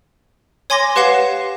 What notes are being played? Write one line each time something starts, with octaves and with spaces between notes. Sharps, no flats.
C#5 G#5 C6 D6 A#6
G4 B4 F5 F#5 C7 E7